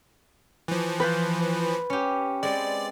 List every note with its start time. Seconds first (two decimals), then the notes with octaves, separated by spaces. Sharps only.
0.68 E3 F3
1.00 F4 B4 C5 B5
1.90 C#4 G4
2.43 G#3 C4 D5